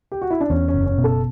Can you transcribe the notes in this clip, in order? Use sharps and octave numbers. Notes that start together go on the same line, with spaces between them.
G4
F#4
E4
D4
E2 C#4
C#4
F#1
C#4
B2
A4